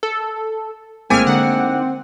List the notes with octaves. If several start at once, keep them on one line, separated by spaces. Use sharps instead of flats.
A4
G#1 A2 G#3 A#3 C4 G#5 D6 F6
D3 D#4 F#5